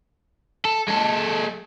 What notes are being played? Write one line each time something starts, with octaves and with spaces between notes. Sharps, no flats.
A4
G#3 A4